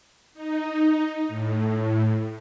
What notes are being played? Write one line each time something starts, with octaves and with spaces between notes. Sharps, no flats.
D#4
A2